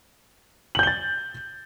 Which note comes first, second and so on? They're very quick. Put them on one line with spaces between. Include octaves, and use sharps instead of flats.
F#7 G6 G7 A6